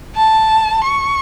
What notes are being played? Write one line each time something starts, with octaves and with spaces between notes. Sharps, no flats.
A5
C#6